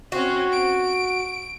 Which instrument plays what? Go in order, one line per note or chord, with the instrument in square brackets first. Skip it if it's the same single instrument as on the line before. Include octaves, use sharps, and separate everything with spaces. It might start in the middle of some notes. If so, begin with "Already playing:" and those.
[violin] C4 C#4 [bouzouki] F#4
[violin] D7